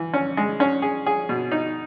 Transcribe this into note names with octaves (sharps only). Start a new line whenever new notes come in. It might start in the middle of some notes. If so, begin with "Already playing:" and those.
Already playing: E3
C#4
G#3
C#4
G#4
G#4
B2
D#4